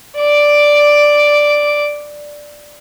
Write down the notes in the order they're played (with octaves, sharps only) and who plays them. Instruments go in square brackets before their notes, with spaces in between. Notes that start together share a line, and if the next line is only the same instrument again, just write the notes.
[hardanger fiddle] D5 D6